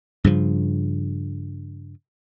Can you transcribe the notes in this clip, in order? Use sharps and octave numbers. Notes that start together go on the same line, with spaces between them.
G2 C#3 F3